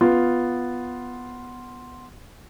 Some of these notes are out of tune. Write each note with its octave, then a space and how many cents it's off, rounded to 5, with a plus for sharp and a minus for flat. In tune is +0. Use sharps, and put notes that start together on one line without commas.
B3 +0 F4 +0